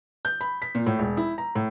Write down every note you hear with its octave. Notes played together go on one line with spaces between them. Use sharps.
G6
B5
B6
A#2
A2
E1
E4
A#5
A2